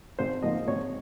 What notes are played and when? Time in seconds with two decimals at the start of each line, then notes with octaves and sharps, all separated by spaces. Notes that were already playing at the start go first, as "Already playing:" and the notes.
0.19 G#1 C5
0.43 G#2 F3 A#3 D#5
0.67 G#1 C#5